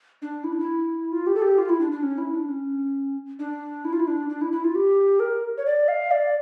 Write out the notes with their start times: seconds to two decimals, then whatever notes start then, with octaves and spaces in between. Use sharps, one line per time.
0.22 D4
0.44 E4
0.52 D4
0.60 E4
1.12 F4
1.27 G4
1.35 A4
1.42 G4
1.58 F4
1.69 E4
1.80 D4
1.92 D4
2.03 C#4
2.18 E4
2.34 D4
2.49 C#4
3.39 D4
3.85 E4
3.93 F4
4.00 E4
4.07 D4
4.29 D4
4.41 E4
4.52 E4
4.64 F4
4.75 G4
5.20 A#4
5.58 C#5
5.66 D5
5.88 F5
6.11 D5